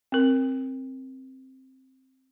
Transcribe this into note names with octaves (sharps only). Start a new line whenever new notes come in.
C4 A#4